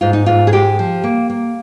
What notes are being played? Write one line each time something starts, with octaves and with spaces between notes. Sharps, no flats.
G#2 F4
D#4
G#2 F4
G#4
G#3 G4
F3
A#3
A#3